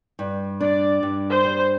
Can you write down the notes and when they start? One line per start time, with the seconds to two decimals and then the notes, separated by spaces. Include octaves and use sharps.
0.19 G2
0.61 D4 D5
1.03 G2
1.31 C5
1.45 G3